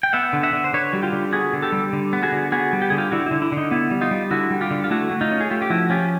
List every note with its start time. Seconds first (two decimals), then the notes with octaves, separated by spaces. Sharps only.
0.03 G5
0.13 B3 E5 F#5
0.33 D3
0.43 E5 F#5
0.53 D3
0.64 C5
0.73 D3 B4 C#5
0.93 G3 F#4
1.03 F4 G4
1.12 D3
1.32 B3 F#4 G#4
1.53 D3
1.62 G4 A4
1.72 G3
1.93 D3
2.13 B3
2.23 F#4 G#4
2.32 D3
2.52 B3 F#4 G#4
2.73 G3
2.82 G4
2.90 D3 G#4
2.98 F4 G4
3.11 D3 E4 F#4
3.26 D3 E4
3.42 E4
3.52 D3 D#4
3.71 B3 E4
3.91 G3
4.01 D#4 F4
4.11 G3
4.31 D3 E4 F#4
4.51 G3
4.61 F4 G4
4.71 D3
4.84 F4
4.90 A3 E4 F#4
5.11 A3
5.21 D#4 F4
5.31 C#4
5.41 G#4
5.51 A3 F4 G4
5.62 G4
5.70 F3 E4 F#4
5.90 C#4 F4 G4